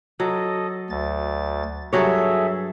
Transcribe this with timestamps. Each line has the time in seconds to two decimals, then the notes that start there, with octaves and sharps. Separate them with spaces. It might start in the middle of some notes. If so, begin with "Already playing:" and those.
0.20 F#3 A4 D#5
0.90 D2 A6
1.93 G2 F#3 G#4 A4 C#5 E5